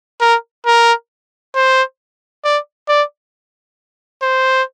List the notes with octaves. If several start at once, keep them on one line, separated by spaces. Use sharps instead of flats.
A#4
A#4
C5
D5
D5
C5